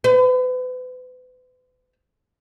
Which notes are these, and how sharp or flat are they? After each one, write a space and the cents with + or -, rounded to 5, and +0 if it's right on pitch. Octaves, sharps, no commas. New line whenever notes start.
B4 +40